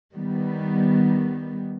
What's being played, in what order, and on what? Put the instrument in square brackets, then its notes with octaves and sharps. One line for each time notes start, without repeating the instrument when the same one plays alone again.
[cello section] D#3 G3 B3